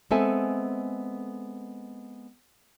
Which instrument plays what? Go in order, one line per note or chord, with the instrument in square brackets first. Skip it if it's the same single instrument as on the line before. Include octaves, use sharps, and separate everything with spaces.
[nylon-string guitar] G#3 B3 C4 A4 E5 G#5